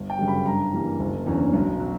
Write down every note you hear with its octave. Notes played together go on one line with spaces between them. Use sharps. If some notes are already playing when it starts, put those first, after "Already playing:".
Already playing: G1
G5
F#2 C#3 G3
B5
G2 A#5
E3 G3 A#3
F#1
E2 D3 A#3 C#4
B1
F#3